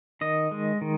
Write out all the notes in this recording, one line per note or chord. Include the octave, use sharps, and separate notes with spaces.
D#3 D#5
G#3
D#3